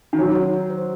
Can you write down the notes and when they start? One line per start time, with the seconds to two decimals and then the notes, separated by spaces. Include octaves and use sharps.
0.13 D#3
0.18 F#3 F#4
0.35 F#4
0.53 F#4
0.70 C5